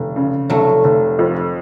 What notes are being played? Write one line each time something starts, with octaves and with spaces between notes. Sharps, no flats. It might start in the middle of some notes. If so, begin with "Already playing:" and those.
Already playing: F1 D3
C#3
F1 F#3 A3
F1
F2